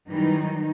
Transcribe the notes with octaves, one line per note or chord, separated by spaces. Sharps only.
F#2 D#3 E3 G3 D#4